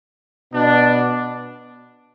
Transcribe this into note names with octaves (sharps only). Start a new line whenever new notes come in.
B2 B3 D4